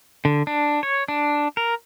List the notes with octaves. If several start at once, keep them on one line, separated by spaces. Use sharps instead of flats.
D3
D4
C#5
D4
A#4